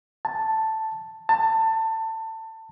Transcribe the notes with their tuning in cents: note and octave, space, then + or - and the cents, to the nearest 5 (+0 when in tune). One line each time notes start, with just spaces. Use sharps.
A5 +5
A5 +25